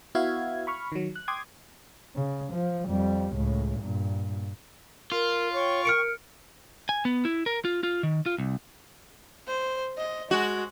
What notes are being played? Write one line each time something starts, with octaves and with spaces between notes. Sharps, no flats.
B3 E4 F#4 E5 F5 G#6
B5 C#6 F6
D#3 F#3
F#6
G5 C6 D6 D#6 G#6
C#3
F3
F2 G3
C#2 A2
G2 A#2
F4 A#4
C#5 G5 C#6
A#4 F6 C#7 D7
G#5
B3
E4
A#4
F4
F4
D#3
F4
C2
C5
D#5
G#3 F#4